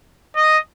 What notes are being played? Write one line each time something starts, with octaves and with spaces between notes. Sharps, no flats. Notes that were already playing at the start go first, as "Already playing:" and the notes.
D#5